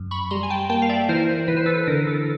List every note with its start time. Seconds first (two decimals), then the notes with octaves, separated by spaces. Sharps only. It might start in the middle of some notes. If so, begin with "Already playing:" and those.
Already playing: F#2
0.11 B5 C#6
0.31 G3 A#5 C6
0.43 G#5
0.50 G5 A5
0.70 A#3 G5 A5
0.82 F5
0.89 D5 E5
1.09 E3 A#4 C5
1.48 E3 B4
1.57 C5
1.66 A4 B4
1.87 D3 A#4
2.07 A4